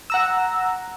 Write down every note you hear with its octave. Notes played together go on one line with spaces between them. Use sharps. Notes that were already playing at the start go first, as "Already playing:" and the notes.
F#5 A#5 E6